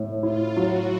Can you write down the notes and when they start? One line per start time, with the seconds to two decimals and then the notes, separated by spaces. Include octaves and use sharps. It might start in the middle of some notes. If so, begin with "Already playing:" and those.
Already playing: A2
0.22 E4 F4
0.56 F#3 F#4